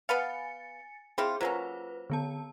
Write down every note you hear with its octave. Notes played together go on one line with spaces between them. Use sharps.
B3 B4 F5 G#5 A6 C#7
C4 E4 F4 G#4
F#3 A#3 C#4 F4 B4 C5
D3 B3 A5